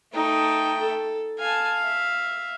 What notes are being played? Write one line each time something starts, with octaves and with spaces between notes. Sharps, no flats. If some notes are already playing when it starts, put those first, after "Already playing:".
A3 D#4 G5
A4
F5 G#5 A5
E5